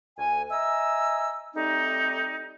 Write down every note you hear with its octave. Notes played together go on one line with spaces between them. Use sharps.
D2 G#5
D#5 E5 G#5 A#5 E6
G3 A3 C4 D#4